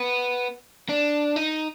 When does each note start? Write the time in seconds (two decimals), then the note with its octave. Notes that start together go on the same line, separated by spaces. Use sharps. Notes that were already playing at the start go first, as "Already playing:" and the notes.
Already playing: B3
0.89 D4
1.36 D#4